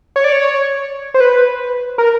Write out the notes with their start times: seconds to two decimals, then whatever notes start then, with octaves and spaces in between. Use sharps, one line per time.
0.16 C#5
0.24 D5
0.32 C#5
1.14 C5
1.20 B4
1.98 A#4